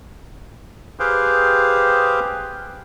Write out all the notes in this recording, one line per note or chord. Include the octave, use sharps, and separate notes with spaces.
G4 G#4 B4 C5 F5 G5